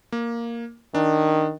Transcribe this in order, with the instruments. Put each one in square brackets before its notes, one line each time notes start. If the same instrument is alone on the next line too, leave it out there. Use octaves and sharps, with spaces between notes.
[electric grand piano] A#3
[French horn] D#3 [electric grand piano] D4